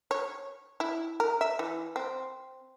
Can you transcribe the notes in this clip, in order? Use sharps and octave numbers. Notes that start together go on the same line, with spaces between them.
C#5
E4
A#4
E5
E3
C4